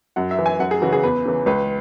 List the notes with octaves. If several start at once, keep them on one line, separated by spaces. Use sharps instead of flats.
F#2 F#5
E5
E3
G#5
F#2 F#5
G#4
C#3 E3 F#4
G#4
E2 B4
C#3 E3
C#2 B4